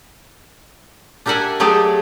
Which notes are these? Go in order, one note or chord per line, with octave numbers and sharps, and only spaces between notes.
D4 G4 A#4 E5 F#5 G#5
F#3 A3 G4 G#4 D5